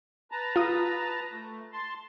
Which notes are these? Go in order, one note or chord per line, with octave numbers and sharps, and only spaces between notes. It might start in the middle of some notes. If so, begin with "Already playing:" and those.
B4 A5 A#5
F4 D#6
A3
A5 C6